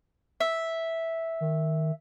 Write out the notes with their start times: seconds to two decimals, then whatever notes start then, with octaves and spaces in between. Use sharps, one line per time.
0.40 E5
1.41 D#3